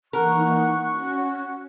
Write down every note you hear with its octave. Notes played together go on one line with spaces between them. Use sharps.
E3 A#3 D#4 A#4 F#5 C#6 F#6
C#4 F#4